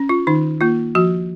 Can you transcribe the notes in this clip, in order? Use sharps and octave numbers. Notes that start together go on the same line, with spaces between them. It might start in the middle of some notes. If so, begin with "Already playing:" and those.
Already playing: C#4
F4
D#3 D#4
A#3 F4
F3 F#4